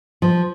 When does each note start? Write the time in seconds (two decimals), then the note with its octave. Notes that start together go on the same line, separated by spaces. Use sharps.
0.22 F3